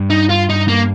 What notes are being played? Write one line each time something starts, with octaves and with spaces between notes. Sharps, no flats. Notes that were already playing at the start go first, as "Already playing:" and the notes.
Already playing: G2
D#4
F4
D#4
A#3